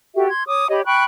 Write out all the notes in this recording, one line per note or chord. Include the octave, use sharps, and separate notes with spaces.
F#4 G4 A4 E5
C6 G#6
C#5 D6 D#6
G4 C#5 D#5 B5
G5 B5 C#6 F#6